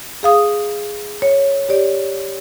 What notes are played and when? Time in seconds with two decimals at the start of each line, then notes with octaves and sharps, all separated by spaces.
0.23 G#4 F5 D#6
1.22 C#5
1.69 G4 C#5 D5